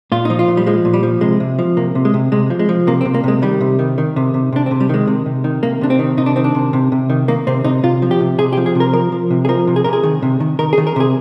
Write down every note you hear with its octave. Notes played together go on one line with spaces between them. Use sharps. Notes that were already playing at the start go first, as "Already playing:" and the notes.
A#2 F4
F3 D#4
F4
A#2
G3
F3 G#3
A#2
G3
F3
C3 G#3
C3
F3
C3 A#3
C3
G#3
C3
C3 G#3
F3
G#3
F3
C3 A#3
C4
C3
A#3
C3 G#3
D#3 G3
C3
D#3
D#3
C3
C3
C3 D4
C4
C3
G3
D#3 G#3
C3
C3
D#3
C3 A#3
C3 D4
C4
D#3
C3 D#4
D4
D#3 C4
D4
C3
C3
C3
D#3
D#3 A#3
C3 C4
C3 D#4
C3 F4
F3
G4
C3
C3 G#4
G4
F3
G#4
C3
A#4
F3 A#4
F3
C3
G#4
F3 A#4
C3
G#4
C3 A#4
G#4
D#3
C3
D#3
D#3 A#4
G#4
D#3
A#4
C3 G#4